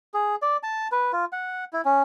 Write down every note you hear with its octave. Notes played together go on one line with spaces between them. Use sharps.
G#4
D5
A5
B4
F4
F#5
E4
C#4